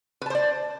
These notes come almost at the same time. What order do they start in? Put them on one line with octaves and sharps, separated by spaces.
B4 A5 C5 D5